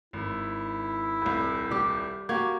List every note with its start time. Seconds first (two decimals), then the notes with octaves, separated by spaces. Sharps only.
0.13 G#1 E4
1.22 D#1 C2
1.71 G3 G4
2.29 A#3 F#4 G4 G#6